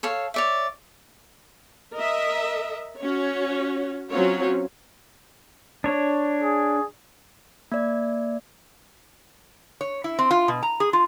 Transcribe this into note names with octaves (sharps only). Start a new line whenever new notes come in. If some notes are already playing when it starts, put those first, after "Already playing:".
A4 C#5 F5
C#5 D5 E5
A#4 D#5 E5
C#4 F#4 C#5
F#3 C4 C#4 F4 F#4 C#5
D4 C#5
G#4
A#3 D5
C#5
E4
C4
F4
B2
A#5
G#4
F4